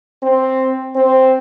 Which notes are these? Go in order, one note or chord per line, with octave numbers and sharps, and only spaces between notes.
C4
C4